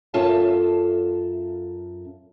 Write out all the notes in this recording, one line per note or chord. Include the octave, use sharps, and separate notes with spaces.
F#2 C#4 F4 A4 E5 A5